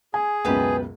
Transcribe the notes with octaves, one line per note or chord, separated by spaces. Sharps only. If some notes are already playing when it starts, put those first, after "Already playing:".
G#4 G#5
C#2 F#2 B2 G4 B4 A5